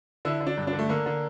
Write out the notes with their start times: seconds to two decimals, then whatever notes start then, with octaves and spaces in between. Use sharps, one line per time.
0.25 D3 E4
0.41 D3
0.47 D4
0.58 G2
0.67 D4
0.73 D3
0.79 A3
0.89 D3 A#3
1.06 D3